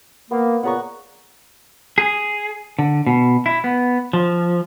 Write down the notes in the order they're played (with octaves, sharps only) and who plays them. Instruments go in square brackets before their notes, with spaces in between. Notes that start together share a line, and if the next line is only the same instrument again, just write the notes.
[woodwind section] A#3 [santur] B3
[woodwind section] A#2 C#3 B3 [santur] F#5 A#5 C#6
[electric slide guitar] G#4
D3
B2
E4
B3
F3